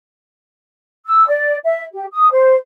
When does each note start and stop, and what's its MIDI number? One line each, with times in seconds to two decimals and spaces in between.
1.06 1.27 88
1.28 1.56 74
1.64 1.82 76
1.93 2.05 67
2.12 2.31 87
2.31 2.55 72